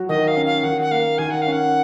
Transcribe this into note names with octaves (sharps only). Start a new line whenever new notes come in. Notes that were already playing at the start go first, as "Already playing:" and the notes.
Already playing: F#3 F#4
D#3 D#5
F5
C#4
F5
D#3 F#5
F#5
A#3 F5
D#3 G#5
F#5
C#4 F5
F#5